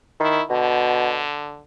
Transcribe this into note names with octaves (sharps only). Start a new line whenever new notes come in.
D#3 E4
B2 D3